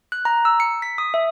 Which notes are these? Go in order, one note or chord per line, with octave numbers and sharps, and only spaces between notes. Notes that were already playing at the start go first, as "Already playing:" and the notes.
F#6
A#5
E6
C#7
B6
D#6
E5